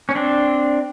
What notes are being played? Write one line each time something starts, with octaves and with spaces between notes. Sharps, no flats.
C#4
C4 D4